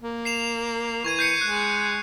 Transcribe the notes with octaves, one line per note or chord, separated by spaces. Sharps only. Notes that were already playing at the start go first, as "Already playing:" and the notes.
A#3
C7 E7 F7
E3 C#6 G#6 D#7
G6 C7 C#7
G#3 F#6